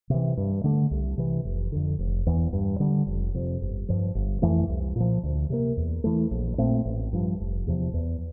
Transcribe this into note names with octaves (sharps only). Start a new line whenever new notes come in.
C3 E3
G2
D3 A3
C2
C3 E3
F1
F2 D3
F1
E2 E3
G2
D3 G3
F1
F2 C3
G1
G2 F3
G1
F2 E3 A3
C2
A#2 F3
D2
C3 F3 A#3
E2
E3 A3
A#1
A#2 A3 C4
A1
G2 F3
F1
E2 C3 F3
E2